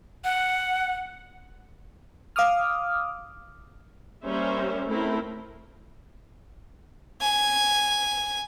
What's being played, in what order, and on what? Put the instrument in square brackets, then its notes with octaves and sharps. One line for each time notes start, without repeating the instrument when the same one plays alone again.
[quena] F#5
[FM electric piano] F5 D6 D#6 F6
[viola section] G3 A#3 C#4 A#4 C5 E5
A3 C4 E4 A#4
[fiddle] G#5